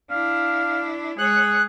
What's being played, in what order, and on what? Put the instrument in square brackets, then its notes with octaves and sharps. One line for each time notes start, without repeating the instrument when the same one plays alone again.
[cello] D4 E4 [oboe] F5
[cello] G#3 C#5 [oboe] G#4 [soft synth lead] F#6